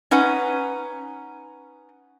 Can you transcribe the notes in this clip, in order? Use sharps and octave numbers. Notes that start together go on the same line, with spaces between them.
C#4 D#4 B4 F#5